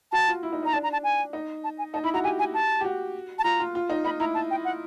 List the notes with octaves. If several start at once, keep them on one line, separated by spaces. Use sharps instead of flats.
F#4 A5
F4
E4
D#4
D#4 A#5
D4 A5
A#5
A5
G#5
D#4
A5
G#5
D#4 A5
E4 B5
F#4 A#5
G4 G#5
G#5
A5
G4
F#4
A5
F4 A#5
F4
F4
D#4
D#4 B5
E4 A#5
A5
G5
F#5